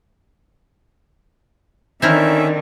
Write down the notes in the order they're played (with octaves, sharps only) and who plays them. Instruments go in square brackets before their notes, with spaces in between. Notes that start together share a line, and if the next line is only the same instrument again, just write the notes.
[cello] D3 D#3 [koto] C4 E4 A#4 [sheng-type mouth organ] C#4 E5 [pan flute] D#4